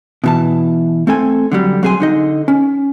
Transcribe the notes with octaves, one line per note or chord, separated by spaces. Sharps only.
B2 E3 A5
A3 C4 A4 G#5
D3 F#3 G3
F#3 C4 G#4 E5 G#5 C6
D3 D#4 D#5
C#4